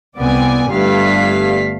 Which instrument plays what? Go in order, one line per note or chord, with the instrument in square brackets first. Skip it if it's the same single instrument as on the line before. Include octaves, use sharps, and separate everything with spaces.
[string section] C2 B3 C4 D5 G#5
G1 G2 G3 A3 F5 B6